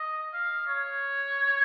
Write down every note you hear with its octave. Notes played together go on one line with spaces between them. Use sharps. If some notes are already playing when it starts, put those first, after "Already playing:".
Already playing: D#5
F5
C#5